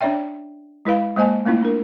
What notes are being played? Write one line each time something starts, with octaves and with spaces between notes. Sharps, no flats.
C#4 D4 C#5 D5 E5 G5
G#3 E4 B4 F5 B5
G#3 A#3 C5 D#5 G#5 A5
A3 A#3 C#4 E4 F4
D4 A#4